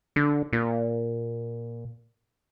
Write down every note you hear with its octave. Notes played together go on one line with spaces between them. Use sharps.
D3
A#2